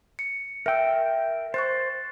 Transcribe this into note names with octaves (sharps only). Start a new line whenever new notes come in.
C#7
A#4 E5 G5 E6
C5 C#6 F#6 A6